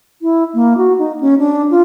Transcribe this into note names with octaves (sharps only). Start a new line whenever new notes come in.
E4
A#3
F#4
D#4
C#4
D4
F4